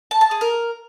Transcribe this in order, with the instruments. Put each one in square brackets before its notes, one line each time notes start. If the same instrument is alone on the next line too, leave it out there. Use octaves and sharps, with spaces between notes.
[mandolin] A5
A5
G#4
A#4